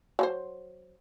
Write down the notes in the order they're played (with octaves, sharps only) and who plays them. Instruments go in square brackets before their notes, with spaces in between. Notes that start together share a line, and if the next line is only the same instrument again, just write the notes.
[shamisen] F#3 G#4 C5